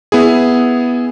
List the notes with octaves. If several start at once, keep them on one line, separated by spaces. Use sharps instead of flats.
B3 E4 G#4